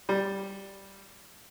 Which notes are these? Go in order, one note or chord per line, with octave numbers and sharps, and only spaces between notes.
G3